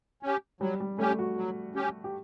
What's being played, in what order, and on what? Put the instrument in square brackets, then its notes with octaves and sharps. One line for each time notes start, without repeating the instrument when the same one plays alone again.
[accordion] C#4 G4
[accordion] F#3 [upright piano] G3
[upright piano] G3
[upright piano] A3 [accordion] C#4 G4
[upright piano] F#4
[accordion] F#3
C#4 G4
[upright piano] G4